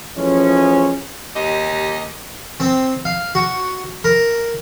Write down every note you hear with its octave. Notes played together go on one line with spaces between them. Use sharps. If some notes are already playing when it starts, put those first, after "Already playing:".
E3 F3 G#3 A3 C#4
D#2 G4 D#5
C4
F5
F#4
A#4